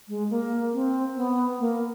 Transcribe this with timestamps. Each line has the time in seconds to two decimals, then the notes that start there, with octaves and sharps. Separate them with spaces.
0.09 G#3
0.30 A#3
0.74 C4
1.16 B3
1.60 A#3